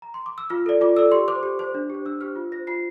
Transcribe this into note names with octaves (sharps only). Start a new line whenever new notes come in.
A#5
C6
D6
E6
F4 F6
A4 D5
F4 D6
A4 D5 E6
G4 C6
C5 D6
G4
C5
D4
G4 C5
D4 E6
G4 C5 F6
F4
C5 A#6
F4 C7